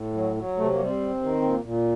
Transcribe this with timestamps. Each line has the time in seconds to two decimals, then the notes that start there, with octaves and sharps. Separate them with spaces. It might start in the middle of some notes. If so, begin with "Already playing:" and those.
Already playing: A2
0.14 F#3
0.36 F#3
0.57 C3 A3
0.71 A#3
0.79 G3
0.86 C4
1.00 C3
1.22 D#3
1.42 A#2
1.64 A#2